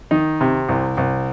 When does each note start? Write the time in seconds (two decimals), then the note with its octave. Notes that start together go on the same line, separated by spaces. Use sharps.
0.11 D#3 D#4
0.41 C3
0.69 C2
0.97 C2